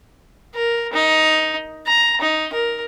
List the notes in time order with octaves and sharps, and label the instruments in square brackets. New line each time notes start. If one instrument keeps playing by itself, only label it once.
[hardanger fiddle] A#4
D#4
A#5
D#4
A#4